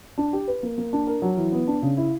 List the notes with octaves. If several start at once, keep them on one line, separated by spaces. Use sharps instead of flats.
D4
G4
B4
A#3
A#3
D4
A#4
F#3
E3
B3
D4
C#3
E4